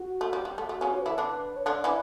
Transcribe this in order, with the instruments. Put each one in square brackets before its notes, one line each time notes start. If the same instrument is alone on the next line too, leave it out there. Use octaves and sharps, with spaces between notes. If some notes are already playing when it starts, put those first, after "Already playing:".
Already playing: [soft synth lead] F#4
[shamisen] A3
G3
G3
A3
A3
C#3 C#4
[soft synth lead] C#5
B4
[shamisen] E3 E4
[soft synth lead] A4
[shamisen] D3 D4 [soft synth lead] B4
[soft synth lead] C#5
[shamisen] D3 D4 [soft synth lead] D5
[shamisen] E3 E4